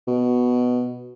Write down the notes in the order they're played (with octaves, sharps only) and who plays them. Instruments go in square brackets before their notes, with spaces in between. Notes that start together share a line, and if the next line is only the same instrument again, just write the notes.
[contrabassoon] B2